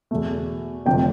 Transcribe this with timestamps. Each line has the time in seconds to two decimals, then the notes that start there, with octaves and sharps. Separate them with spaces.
0.11 E2 B2 A3
0.86 F1 F2 D3 F3 A3 G5